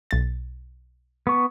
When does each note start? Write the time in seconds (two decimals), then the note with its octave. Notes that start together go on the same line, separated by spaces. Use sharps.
0.11 B1 A6
1.27 B3 C#6